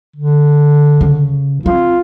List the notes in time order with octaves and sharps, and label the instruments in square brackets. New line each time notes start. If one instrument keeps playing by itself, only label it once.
[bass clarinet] D3
[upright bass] C#3
[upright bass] C4 [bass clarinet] F4